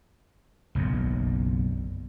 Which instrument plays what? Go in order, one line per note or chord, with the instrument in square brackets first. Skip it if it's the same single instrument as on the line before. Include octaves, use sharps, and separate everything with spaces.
[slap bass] F#1 B1 F#2